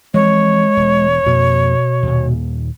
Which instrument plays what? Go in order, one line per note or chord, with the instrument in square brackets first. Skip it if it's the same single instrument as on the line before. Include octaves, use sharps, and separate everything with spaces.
[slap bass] E3 F3 C4 [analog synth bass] G#3 [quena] C#5
[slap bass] E1
[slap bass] F2 A#3 [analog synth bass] B2
[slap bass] D#2 A#2